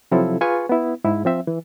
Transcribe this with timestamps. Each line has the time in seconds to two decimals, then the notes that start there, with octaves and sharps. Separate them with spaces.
0.11 C3 F3 F#3 C4 E4 A4
0.41 F4 G#4 B4 G#5 C#6
0.69 B3 E4
1.04 G#2 E4
1.25 F3 C4 E5
1.47 E3